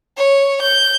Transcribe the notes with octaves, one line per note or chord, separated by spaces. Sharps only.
C#5
G6